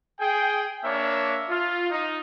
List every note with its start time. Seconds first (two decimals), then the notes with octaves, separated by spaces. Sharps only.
0.20 G#4 G5
0.83 A#3 D4 C#5 E5
1.48 F4
1.91 D#4